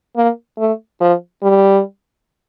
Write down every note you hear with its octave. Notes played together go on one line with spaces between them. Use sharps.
A#3
A3
F3
G3